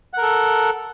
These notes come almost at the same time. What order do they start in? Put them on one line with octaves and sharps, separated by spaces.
F#5 A#4 A4